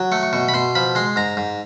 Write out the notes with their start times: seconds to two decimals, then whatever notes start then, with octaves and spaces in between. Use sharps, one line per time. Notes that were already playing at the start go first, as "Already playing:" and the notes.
Already playing: F#3
0.12 A3 C#6
0.23 C#6
0.33 B2 C#6
0.48 B5
0.54 B2 C6
0.75 F3 B5
0.95 G#3 C6
1.16 G#2 A#5
1.37 G#2